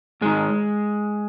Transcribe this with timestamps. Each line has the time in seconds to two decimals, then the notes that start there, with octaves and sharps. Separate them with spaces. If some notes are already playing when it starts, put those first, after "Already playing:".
0.21 G#2 D#3 G#3